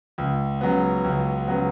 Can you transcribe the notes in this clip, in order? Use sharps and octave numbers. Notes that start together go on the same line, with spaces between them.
C#2
C#3 F#3 B3
C#2
C#3 F#3 B3